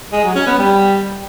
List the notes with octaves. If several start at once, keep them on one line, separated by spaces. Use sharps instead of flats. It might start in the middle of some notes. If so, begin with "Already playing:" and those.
G#3
F#3
C#4
B3
G3